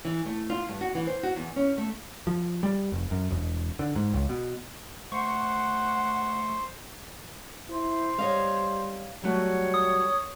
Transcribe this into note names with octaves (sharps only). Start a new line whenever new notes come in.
E3
A3
F4
G2
F#4
E3
C5
F#4
E2
C#4
A3
F3
G3
F1
F#2
E1
D3
G#2
C#2
B2
A3 C5 F#5 C#6
E4 C5
G3 C#5 D#5 F5
F#3 G3 A3 F#4 C#5
D#6